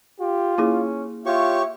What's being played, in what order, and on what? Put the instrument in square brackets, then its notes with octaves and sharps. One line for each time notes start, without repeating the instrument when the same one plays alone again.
[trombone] F4 [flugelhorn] G4
[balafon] A#3 E4 G#4 [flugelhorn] C#4
[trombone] F4 [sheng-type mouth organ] G4 C#5 C#6 [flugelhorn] E5